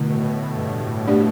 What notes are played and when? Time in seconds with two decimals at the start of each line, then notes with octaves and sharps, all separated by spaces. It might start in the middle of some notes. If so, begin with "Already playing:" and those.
Already playing: B2 D3 A3 E4
0.10 A2
0.26 A2
0.42 A2
0.55 G2
0.69 A2
1.07 A3 D4 G4 D5